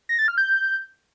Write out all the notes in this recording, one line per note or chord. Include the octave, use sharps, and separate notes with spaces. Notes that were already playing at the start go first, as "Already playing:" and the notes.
A#6
A6
F6
G6